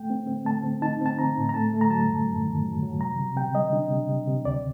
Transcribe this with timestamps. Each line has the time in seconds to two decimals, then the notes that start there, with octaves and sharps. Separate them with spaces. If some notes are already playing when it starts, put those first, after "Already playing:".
Already playing: A3 G5
0.10 C4
0.27 C4
0.45 A3 A5
0.63 C4
0.82 D#4 A5
1.01 C4 A5
1.19 C4 A#5
1.37 A2
1.49 A#5
1.54 A3 A5
1.74 A3
1.81 A#5
1.90 F#3 A5
2.09 F#2
2.27 F#2
2.45 D#3
2.63 F#3
2.82 F#3
3.00 C3 A#5
3.19 C3
3.36 C3 G5
3.54 G3 D#5
3.73 D4
3.90 C3
4.09 C3
4.27 C3
4.45 D2 D5